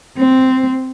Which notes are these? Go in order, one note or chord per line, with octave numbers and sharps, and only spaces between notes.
C4